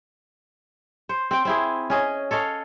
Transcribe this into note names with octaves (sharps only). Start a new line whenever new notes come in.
C5
C4 G5
C4 E4 G#4
C#4 G#4 D#5
A4 C#5 D#5 F5